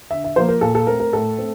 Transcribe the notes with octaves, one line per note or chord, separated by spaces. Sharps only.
D3 E5
E5
F3 A#3 C5
A#4
A#2 A4
A4
A3 C4 A#4
A#4
A2 A4
A3 C4